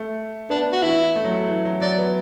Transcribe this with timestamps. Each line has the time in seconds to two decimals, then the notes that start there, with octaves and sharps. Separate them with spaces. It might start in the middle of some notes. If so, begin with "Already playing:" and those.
Already playing: A3
0.50 B3 D4
0.72 F#4
0.82 E3 E4
1.16 A3
1.24 F#3
1.32 A3
1.48 E3
1.65 F#3
1.81 F#3 D5
1.98 B3